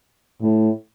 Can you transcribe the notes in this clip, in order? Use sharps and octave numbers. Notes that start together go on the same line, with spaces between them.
A2